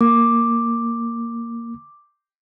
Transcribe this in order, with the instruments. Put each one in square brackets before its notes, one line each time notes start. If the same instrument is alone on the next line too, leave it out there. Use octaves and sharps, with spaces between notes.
[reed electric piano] A#3 [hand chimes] D6